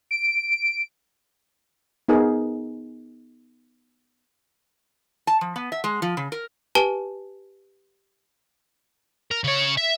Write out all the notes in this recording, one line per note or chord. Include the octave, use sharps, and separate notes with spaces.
D7
B3 D#4 G#4 A#4
A5
F3
B3
E5
G#3
F3
C#3
A#4
G4 B4 G#5 A5 G7
A#4
C#3 C#5
E5